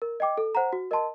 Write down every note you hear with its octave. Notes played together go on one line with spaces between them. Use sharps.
A#4
D#5 G5 D6
A4
C5 F#5 A#5
F#4
A#4 D#5 A5 C6